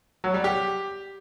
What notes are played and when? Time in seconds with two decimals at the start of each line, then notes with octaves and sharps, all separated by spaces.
0.24 F#3
0.34 G3
0.44 G4